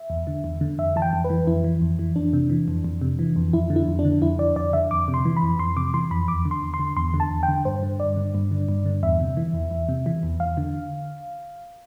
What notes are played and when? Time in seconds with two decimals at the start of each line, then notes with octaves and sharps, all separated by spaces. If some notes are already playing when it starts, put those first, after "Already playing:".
Already playing: E5
0.10 E2
0.27 D3
0.44 E2
0.61 D3
0.78 F2 E5
0.96 E3 A5
1.02 G5
1.13 F2
1.24 B4
1.30 E3
1.47 F2 E4
1.64 E3
1.81 F2
1.99 E3
2.16 F2 D4
2.33 C3
2.50 E3
2.68 F2
2.84 F2
3.01 C3
3.19 E3
3.36 F2
3.53 F2 E4
3.70 D3
3.76 E4
3.88 F2
3.99 D4
4.05 D3
4.22 F2 E4
4.39 D3 D5
4.56 F2 D5
4.73 D3 E5
4.91 F2 D6
5.08 C3
5.14 C6
5.25 E3
5.37 B5
5.43 F2
5.59 F2 C6
5.76 C3 D6
5.94 E3 C6
6.11 F2 B5
6.28 E2 D6
6.45 D3
6.51 C6
6.62 E2
6.74 C6
6.79 D3
6.97 E2 C6
7.14 D3
7.20 A5
7.31 E2
7.43 G5
7.48 D3
7.65 G2 C5
7.83 D3
8.00 G2 D5
8.16 D3
8.35 G2
8.51 D3
8.68 G2
8.86 D3
9.03 E2 E5
9.20 C3
9.37 E3
9.54 E2
9.71 E2
9.89 C3
10.06 E3
10.23 E2
10.40 E2 F5
10.57 D3